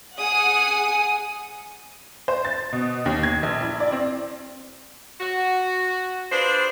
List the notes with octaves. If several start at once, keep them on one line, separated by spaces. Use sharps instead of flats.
G#4 F#5 D#6
C5
A6
B2
D#2
G#6
A#1
E4
D5
C4
F#4
D4 F4 G#4 B4 C5